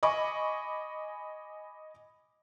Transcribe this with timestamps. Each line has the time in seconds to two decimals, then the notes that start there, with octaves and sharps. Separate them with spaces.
0.03 D#5 G#5 B5 C#6 D6